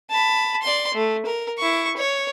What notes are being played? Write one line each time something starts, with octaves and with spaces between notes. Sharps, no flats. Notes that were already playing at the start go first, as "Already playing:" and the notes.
A5 B5
D5 C6
A3
A#4
E4 C#6
C#5